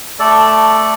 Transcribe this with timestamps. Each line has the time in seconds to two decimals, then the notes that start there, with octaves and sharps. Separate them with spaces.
0.19 A3 A4 D5